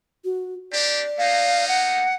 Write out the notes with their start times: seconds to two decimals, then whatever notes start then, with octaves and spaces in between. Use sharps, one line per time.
0.25 F#4
0.72 C4 D4 G4 D5
1.18 A3 A#3 D#4 F5
1.68 F#5